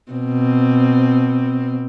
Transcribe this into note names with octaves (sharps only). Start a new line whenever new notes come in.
B2 C4